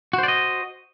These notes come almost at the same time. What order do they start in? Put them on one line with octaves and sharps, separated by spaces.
F#4 C5 D5 D#5